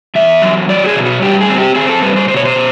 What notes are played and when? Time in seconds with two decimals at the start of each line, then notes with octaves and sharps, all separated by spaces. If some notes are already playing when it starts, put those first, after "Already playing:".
0.15 E2 E5
0.42 F#3
0.69 F#3 D5
0.86 G#4
0.96 B2
1.05 F#4
1.22 G2 G4
1.41 G#4
1.49 C4
1.58 G4
1.75 C4 G#4
1.89 A4
2.02 G2 B4
2.16 C5
2.28 B2 C5
2.37 C#5
2.45 C5
2.56 B2